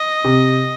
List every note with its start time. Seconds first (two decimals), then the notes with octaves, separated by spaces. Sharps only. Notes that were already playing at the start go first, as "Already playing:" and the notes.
Already playing: D#5
0.24 C3